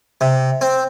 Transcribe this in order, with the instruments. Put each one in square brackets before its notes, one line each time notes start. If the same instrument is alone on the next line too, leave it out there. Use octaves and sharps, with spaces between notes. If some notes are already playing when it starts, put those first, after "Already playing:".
[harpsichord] C3
C4